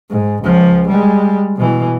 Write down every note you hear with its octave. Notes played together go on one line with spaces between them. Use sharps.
G#2
C#2 F3
G3 G#3
B2 E3